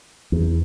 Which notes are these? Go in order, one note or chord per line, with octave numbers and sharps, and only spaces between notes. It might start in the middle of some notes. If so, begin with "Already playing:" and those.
E2